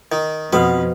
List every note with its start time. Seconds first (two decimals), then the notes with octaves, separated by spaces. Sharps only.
0.12 D#3
0.53 F2 B2 B3 B4 F5